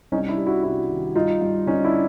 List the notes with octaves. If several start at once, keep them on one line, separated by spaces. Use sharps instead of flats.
C2 C#4 D#4
D4 E4
G3
E4 F#4
C3 E4 F#4
D#3
G2 D#4 F4
G2
D3 C#4 D#4
D4 E4